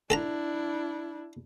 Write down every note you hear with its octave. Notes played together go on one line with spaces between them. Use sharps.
D4 E4 A4 A5 A#5